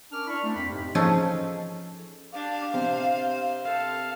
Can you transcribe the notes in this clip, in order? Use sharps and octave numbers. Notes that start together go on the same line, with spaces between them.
C#4 D4 A#4 D6 F6
D4 E4 D5 A5 B5 C#6
A3 C4 D4
F2 C4 B5
F2 G#2 C3
F3 C#4 D#4 G#4 A4
D4 G4 F5
C3 C4 C5
A4 F5